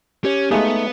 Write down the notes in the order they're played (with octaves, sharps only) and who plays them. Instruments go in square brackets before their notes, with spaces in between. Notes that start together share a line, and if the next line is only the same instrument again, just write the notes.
[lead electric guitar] C#4 [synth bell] G4 C#5
[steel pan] G#3 G#4 [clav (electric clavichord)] A3 D#4 [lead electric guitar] B3 [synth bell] F5